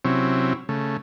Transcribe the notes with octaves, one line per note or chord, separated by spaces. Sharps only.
C3 F#3 C4 C#4 E4
C#3 A3